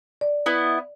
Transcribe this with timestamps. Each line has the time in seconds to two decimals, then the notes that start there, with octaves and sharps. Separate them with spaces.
0.21 D5
0.46 B3 E4 D#5